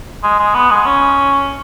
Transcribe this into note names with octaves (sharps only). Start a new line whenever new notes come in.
G#3
G#3
B3
G#3
C#4